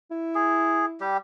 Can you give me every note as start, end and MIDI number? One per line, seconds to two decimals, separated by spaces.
0.11 1.05 64
0.35 0.86 68
1.00 1.17 55
1.00 1.17 67